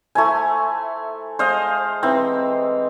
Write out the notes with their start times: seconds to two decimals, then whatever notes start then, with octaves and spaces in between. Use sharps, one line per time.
0.15 A3 E4 C5 G#5 A#5
1.39 G#3 C5 D#5 F5
2.03 E3 C4 D#4 F#5